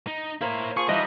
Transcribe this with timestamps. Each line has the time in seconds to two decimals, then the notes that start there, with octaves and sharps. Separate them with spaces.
0.07 D#4
0.41 A#3 E4 C5 C#5
0.77 F3 G#4 C#6
0.89 E3 G3 D#4 D#5 B5 D6